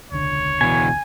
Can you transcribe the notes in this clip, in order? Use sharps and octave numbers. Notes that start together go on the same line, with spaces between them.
E1 C#2 D3 C#5
B2 E3 G#5